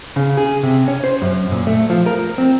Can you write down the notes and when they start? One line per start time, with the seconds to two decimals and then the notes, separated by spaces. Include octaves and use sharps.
0.16 C#3
0.37 G#4
0.63 C3
0.88 C#4
1.04 C5
1.22 F#2
1.51 A#2
1.67 A3
1.90 F3
2.06 A#4
2.38 C4